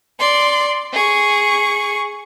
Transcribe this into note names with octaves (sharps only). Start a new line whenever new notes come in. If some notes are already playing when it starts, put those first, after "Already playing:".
D5 C6
G#4 C#6